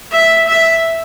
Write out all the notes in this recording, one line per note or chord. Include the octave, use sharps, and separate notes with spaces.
E5
E5